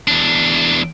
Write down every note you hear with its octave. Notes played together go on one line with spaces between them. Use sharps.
E2 D4